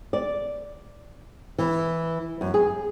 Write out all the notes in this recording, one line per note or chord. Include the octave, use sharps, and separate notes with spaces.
D5
E3
F#2
G#4